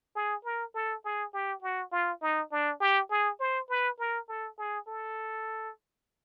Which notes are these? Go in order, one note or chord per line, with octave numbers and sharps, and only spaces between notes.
G#4
A#4
A4
G#4
G4
F#4
F4
D#4
D4
G4
G#4
C5
B4
A#4
A4
G#4
A4